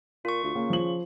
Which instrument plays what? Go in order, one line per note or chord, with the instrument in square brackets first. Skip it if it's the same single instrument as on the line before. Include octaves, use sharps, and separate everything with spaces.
[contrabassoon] A#2 [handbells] F4 C#6
[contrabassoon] D2
[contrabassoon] C#3 [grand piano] A#3
[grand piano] F3 F#7